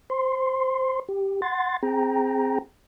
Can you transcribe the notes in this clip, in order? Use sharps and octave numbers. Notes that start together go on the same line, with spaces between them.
C5 C6
G4
F#5 C6 A6
C4 G#4 G5 A#5